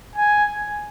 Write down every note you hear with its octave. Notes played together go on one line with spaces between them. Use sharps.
G#5